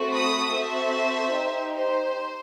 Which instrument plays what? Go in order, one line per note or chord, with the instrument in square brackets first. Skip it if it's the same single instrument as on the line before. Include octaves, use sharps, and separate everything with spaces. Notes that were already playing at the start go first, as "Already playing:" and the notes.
Already playing: [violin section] A3 C4 F#4 A4
B5 D#6
C4 F#4 A4 C5 E5
D#4 G4
C5